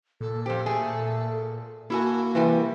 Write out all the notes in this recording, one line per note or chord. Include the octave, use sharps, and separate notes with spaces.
A#2 A4
F2 G4 C5
A3 G#4 A4
A#3 E4 F#4 A4 G#5
C3 E3 G3 G4